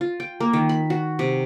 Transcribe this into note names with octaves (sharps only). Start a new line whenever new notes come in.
F4
G5
A#3
D#3
B5
F#4
C3